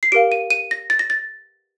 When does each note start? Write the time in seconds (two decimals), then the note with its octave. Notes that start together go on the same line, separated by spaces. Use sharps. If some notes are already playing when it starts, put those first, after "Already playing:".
0.03 C7
0.12 G4 A#4 F5 D7
0.32 D#7
0.50 D#7
0.71 A#6
0.90 A6
0.99 A#6
1.10 A6